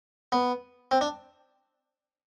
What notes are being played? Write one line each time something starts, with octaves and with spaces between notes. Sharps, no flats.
B3
C4
D4